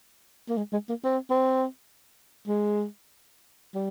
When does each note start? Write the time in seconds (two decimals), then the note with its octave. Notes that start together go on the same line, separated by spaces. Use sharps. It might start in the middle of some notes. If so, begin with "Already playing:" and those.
0.49 A#3
0.58 G#3
0.73 G#3
0.89 A#3
1.04 C4
1.30 C4
2.47 G#3
3.75 G3